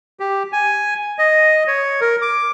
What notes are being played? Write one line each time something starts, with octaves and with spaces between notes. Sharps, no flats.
G4
G#5
D#5
C#5
A#4
D6